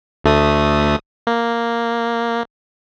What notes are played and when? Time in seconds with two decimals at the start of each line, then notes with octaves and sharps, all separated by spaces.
0.24 D2 A3 D#6
1.27 A#3